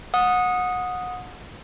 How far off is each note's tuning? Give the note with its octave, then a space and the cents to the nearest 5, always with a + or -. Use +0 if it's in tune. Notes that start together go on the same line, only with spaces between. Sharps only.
F#5 -25 D#6 +0